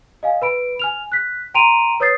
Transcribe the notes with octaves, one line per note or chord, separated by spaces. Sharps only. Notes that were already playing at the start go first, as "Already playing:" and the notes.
D#5 F5 G#5
B4 B5 D7
G#5 F6 F7
F#6 B6
G5 A#5 C6 D7 D#7 F7
B4 C#5 D#6 G6 A6 C7